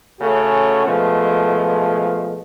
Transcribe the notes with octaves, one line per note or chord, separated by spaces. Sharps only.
C#3 A3 C#4 F#4
B2 F3 G#3 A3